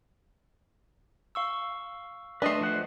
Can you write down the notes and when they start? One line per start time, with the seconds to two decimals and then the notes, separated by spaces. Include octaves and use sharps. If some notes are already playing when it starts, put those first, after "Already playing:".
1.35 F5 C#6 E6
2.42 A3 D4 B4 D#5 C6
2.61 F3 C5 F#5